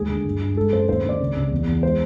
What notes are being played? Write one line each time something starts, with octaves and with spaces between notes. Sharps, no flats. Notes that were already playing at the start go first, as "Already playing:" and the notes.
Already playing: D#2 G#3 G#4
D2
G2
G2
G#3 A4
F#2 C5
D#2 C5
D#2 D5
C#2
C#2
E2
E2
G#3 C5